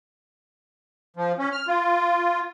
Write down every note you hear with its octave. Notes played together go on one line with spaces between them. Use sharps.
F3
C#4
F6
F4